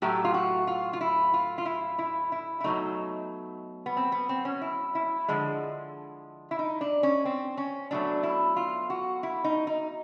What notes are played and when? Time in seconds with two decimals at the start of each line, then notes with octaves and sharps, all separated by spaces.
0.02 A2 F#3 A3 G4
0.24 F4
0.34 F#4
0.67 F4
0.93 F4
1.01 E4
1.34 F4
1.58 F4
1.65 E4
1.99 E4
2.32 E4
2.60 E4
2.64 B2 F#3 A3 D#4
3.86 B3
3.97 C4
4.12 B3
4.29 C4
4.45 C#4
4.61 E4
4.95 E4
5.28 D3 F3 G#3
6.51 E4
6.59 D#4
6.81 D4
7.03 C#4
7.25 C4
7.57 C#4
7.91 B2 F#3 A3 D4
8.23 E4
8.56 F4
8.90 F#4
9.23 E4
9.44 D#4
9.67 D#4